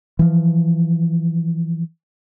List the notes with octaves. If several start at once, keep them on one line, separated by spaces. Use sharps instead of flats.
E3 F3